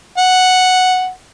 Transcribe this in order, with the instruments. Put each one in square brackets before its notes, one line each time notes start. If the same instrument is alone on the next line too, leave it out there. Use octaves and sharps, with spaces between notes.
[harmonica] F#5